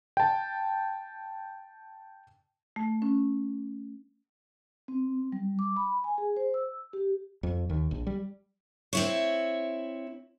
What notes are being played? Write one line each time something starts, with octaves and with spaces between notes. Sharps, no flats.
G5 A5
A3
C#4
C4
G3
D6
B5
G#5
G#4
C5
E6
G4
F2
D#2
A#1
G3
C4 E4 C#5